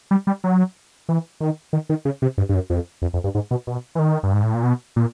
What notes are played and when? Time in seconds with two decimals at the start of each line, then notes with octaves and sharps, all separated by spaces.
0.11 G3
0.27 G3
0.44 F#3
1.09 E3
1.40 D#3
1.73 D#3
1.89 D#3
2.05 C#3
2.22 C3
2.38 G2
2.49 G2
2.54 F#2
2.70 F2
3.02 F2
3.14 F2
3.24 G2
3.35 G#2
3.51 B2
3.67 B2
3.95 E3
3.99 D#3
4.23 G2
4.34 G#2
4.43 A2
4.54 A#2
4.63 B2
4.96 A#2